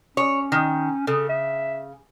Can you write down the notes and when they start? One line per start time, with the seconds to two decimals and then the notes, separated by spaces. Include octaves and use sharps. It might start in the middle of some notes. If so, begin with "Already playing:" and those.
0.17 C#4 C#5
0.52 D#3
1.07 C#3 A4
1.29 E5